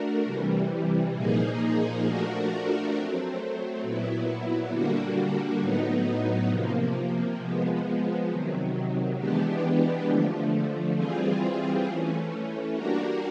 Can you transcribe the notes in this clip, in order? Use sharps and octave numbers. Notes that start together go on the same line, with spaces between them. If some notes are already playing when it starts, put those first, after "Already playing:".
Already playing: A3 D4 F#4 A#4
C3 E3 G3
A#2 F3 A#3 D#4 G#4
F3 A3 D4 F#4 A#4
F#3 A3 C4
A#2 F#3 B3 E4
D3 G3 A#3 D4 F#4
A2 F#3 B3 D#4
C3 F3 A#3
F3 G#3 B3
C3 D#3 F#3
E3 G#3 B3 D4 G4
D3 F3 A3
E3 G3 C4 F4 G#4
E3 A3 C#4
G3 A#3 D4 F#4 A#4